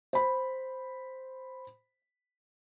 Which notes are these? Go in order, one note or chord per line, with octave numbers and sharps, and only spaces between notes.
C5 B5